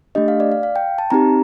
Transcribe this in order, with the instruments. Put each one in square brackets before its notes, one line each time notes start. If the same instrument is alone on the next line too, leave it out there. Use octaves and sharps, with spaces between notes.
[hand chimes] A3 D4 G4 D#5
F5
D5
F5
F5
G5
A5
C4 D#4 G4 A#5